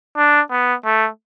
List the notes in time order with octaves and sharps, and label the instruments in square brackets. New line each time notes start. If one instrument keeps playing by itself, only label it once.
[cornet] D4
B3
A3